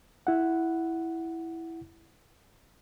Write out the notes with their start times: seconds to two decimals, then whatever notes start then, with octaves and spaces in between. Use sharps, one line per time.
0.27 E4 F#5